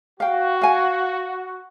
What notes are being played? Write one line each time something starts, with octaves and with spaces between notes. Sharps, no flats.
F#4 F5 G5
F5 G#5